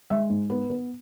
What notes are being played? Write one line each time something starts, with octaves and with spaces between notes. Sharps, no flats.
G#3 E5
G#2
B3 B4
B3